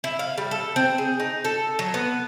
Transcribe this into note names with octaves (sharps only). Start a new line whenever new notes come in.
E4
F5
G3
A4
C4
G#4
D#4
A4
F#3
B3